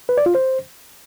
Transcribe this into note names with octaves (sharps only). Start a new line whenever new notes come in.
B4
D5
F4
C5